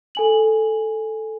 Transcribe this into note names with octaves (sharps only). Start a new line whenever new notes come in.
A4 G#5 F#7